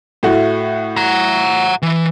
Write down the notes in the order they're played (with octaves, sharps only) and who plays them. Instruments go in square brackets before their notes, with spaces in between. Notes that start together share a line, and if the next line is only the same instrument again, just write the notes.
[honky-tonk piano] A2 A3 F#4
[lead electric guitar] F#5 A#5
E3